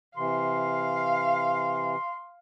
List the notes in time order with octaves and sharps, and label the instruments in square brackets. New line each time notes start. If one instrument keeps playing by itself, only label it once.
[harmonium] C3 E3 [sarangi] F5 [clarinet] C6